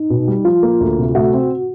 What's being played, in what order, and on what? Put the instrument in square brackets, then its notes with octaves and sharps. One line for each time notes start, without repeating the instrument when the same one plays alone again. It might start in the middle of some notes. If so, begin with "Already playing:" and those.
Already playing: [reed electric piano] D#4
[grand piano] B2
G3
[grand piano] F3 [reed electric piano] F4
[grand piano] A#3
D2
C3
[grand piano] A3 [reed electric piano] F#4
[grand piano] C4